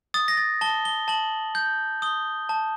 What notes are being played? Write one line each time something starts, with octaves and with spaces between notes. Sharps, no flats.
D#6 A6
A#6
A6
A5 G7
G7
A5 F#7
G6
D#6 G7
A5